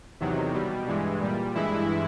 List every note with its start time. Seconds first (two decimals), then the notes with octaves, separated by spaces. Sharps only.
0.20 E2 C3 D#3 F#3
0.54 B2 G3
0.87 G2 E3 G#3
1.21 A#2 G3
1.55 G2 E3 G#3 E4